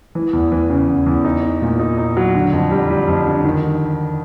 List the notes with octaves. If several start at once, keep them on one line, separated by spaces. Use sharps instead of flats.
E3
E2
E3
C#3
E2
E2
D#4
D#4
A#2
D#4
D#4
F#3
D3
F2
G3
G3
F2
D3
D#3